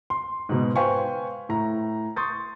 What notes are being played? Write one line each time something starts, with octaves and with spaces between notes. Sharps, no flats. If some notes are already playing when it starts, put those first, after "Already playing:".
C6
G#2 B2
B4 C5 F5 G5 G#5 C#6
A2 A#5
C6 C#6 D#6 G6 A6